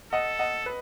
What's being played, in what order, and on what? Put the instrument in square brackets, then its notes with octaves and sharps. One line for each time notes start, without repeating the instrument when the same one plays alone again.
[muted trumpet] A4 [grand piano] D#5 F#5
[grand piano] D#5 F#5
B4